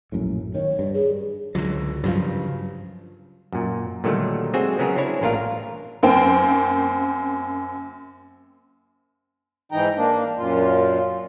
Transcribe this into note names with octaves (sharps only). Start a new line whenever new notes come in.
A#1 F#2 A2
D#3 C#5
G2
G#4
C#2 D3 F#3
G2 C#3 F3 F#3
F#2 A#2
A#2 D3 D#3 F#3 G3 A3
G#3 C4 F#4 G#4 E5
C#3 F#3 B3 G#4 A#4
C4 D4 E4 C#5
A1 A#2 D4 F4 A#4 F5
F#2 A#3 C4 G5
G#2 E3 D#4 G5 A#5
A#3 D4
F#2 A#2 F4